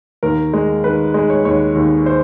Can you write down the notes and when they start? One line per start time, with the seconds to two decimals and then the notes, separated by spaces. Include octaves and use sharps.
0.23 D#2 A#4
0.53 G#3
0.83 D#3 B4
1.14 G#3
1.30 C#5
1.45 D#2 C#5
1.75 D#2
2.06 C5